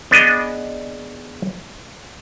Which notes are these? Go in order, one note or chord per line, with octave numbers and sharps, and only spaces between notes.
B3 D4 G#4 D#5